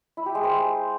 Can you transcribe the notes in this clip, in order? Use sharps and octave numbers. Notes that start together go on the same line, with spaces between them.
E4
G4
G#3
C5